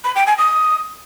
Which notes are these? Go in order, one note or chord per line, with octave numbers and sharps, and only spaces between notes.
B5
G5
G#5
D#6